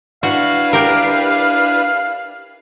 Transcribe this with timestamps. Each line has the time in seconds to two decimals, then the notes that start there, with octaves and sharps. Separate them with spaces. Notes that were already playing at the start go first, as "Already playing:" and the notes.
0.23 D4 E4 F#4 B4 F5
0.73 G4 A#4